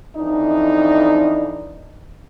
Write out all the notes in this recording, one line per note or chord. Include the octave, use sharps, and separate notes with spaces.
F2 E3 D4 D#4